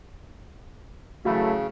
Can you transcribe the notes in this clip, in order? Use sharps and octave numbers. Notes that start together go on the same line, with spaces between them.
C#3 E3 F#3 A3 F#4 F5 B5